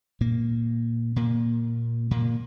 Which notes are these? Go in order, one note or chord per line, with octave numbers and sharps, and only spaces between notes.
A#2 A#3
A#2 A#3
A#2 A#3